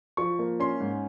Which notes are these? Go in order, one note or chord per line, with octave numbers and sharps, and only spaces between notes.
F3 C#6
A#3
C#4 C6
G#2